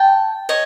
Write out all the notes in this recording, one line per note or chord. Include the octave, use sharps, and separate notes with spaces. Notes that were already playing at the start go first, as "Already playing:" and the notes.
Already playing: G5 A5
C#5 D#5